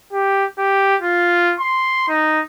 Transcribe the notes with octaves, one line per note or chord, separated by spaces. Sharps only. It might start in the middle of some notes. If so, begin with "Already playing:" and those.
G4
G4
F4
C6
D#4